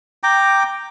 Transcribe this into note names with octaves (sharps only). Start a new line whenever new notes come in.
G5 A#5 D6